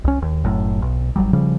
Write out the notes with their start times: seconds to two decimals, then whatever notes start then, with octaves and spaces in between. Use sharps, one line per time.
0.04 C2 C#4
0.22 D#2
0.44 F#1 F#2 A2
0.82 B1
1.16 G#1 C#2 F#3 G3
1.33 C#3 F3 G3